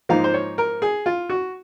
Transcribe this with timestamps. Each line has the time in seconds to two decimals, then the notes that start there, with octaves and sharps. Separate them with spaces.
0.09 G#2 F3 A#3 D#4 F5
0.24 C5
0.34 C#5
0.58 A#4
0.82 G#4
1.06 F4
1.29 F#4